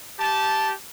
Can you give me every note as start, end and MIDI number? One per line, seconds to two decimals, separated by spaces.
0.19 0.73 67
0.19 0.73 81